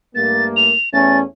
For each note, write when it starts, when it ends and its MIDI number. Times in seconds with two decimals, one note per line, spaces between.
0.15 0.72 43
0.15 0.72 57
0.15 0.72 58
0.15 0.45 93
0.56 0.89 101
0.93 1.20 40
0.93 1.20 57
0.93 1.20 61
0.93 1.17 93